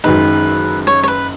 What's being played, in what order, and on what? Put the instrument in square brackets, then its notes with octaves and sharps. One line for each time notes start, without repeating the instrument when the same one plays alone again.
[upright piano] F#1 F#2 D#3 G#3 D#4 [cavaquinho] B4
[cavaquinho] C#5
C#5
B4